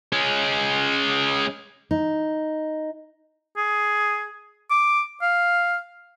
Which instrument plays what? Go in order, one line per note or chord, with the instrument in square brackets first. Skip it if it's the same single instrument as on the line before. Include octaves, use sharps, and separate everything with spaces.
[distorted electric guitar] G#3 C#4
[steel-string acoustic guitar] D#4
[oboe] G#4
D6
F5